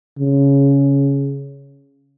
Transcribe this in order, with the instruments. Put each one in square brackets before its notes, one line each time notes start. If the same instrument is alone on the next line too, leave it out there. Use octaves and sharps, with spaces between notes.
[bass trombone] C#3